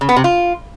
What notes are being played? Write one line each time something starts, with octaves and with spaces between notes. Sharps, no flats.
C#3
B3
C3
F4